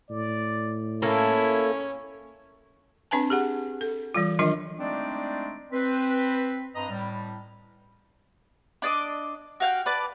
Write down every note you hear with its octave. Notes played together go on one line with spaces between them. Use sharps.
A2 D5
A#3 C#4 E4 A4
C4 D4 B4 G#5 A5
G4 G#4 F#5
A4
E3 G3 F4
D#3 F#3 D4 F4 A#4 D#5
G#3 A3 C4 D4 D#4 D5
C4 B4
G2 C4 B4 D#5 A#5
A2 G3
D4 D5 D#5 D6
F#4 F5 G5
B4 D5 A5